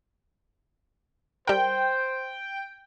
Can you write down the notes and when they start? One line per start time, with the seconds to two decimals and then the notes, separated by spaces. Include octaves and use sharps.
1.47 G3 A#4 C5 G5